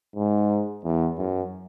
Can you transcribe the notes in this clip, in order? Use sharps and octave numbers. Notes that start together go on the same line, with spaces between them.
G#2
E2
F#2